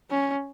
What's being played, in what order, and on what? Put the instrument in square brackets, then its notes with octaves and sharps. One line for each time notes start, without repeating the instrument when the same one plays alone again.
[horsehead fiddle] C#4